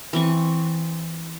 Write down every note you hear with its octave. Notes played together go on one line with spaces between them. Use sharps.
E3 C4 C#6